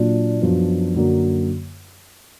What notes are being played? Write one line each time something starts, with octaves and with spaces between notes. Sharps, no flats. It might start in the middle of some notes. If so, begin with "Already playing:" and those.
Already playing: A#2 F#3 D4 F4
F#2 F3 B3 D4
F#2 D3 F#3 A#3